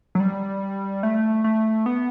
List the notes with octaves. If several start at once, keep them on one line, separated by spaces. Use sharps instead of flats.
F#3
G3
A3
A3
B3